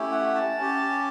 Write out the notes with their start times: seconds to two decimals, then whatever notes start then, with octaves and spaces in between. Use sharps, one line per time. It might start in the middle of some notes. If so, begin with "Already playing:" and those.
Already playing: A3 C#4 E4 G4
0.12 F#5
0.35 A5
0.58 C#4 G4